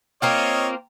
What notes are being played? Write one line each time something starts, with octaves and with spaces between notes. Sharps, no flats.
A#3 C4 F4 C#5 D#5 G5 A#5